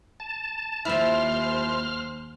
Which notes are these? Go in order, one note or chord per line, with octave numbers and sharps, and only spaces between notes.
A5
D#2 F3 E4 C5 F6